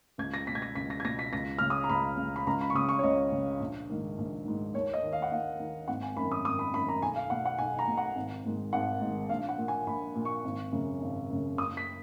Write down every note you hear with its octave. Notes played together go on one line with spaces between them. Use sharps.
C#2 G#6
A#6
B2 B6
G#6
A#6
C#2 B6
A#6
G#6
B2 A#6
B6
C#2 A#6
C#3 F6
D#6
A#5
C#2 B5
C#3
B5
C#2 A#5
B5
C#6
C#3 D#6
C#6
C#5
C#2 D#5
C#3
A#1
G#2 D#3
A#1
G#2 D#3
D#2 C#5
D#5
D#3
F5
F#5
D#2 F5
D#3
G#1 F#5
G#5
F#2 D#3 B5
D#6
G#1 D#6
B5
F#2 D#3 B5
A#5
B1 G#5
F5
B2 F#5
F#5
B1 G#5
A#5
B2
F#5
G#1
G#2 D#3
G#1 F#5
G#2 D#3
A#1 F5
F#5
A#2
G#5
A#1 B5
A#2
C#6
G#1
F#2 C#3
G#1
F#2 C#3
F#1 D#6
B6